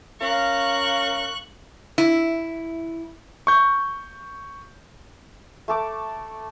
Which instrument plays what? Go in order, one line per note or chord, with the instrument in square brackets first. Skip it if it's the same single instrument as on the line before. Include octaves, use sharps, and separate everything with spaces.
[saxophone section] C#4 A#4 F5 [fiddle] C#6 F#6
[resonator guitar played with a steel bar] E4
[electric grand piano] C#6 G6
[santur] A3 A4 D6